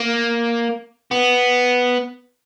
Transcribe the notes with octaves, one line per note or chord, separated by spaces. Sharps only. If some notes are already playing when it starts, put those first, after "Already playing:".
Already playing: A#3
B3